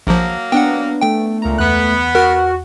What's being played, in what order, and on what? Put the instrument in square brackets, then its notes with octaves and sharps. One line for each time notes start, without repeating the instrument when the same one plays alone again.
[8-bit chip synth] A#1 F3 [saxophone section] F#3 A#3
[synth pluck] B3 D4 [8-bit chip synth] F#5 G5
[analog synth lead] A3 [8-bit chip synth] G5
[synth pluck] C#2 A#5 [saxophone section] A#2
[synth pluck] E2 F#6 [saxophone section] B3
[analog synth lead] F#4 [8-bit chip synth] A#4 F6